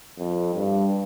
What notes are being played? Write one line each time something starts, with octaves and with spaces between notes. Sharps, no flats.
F2
G2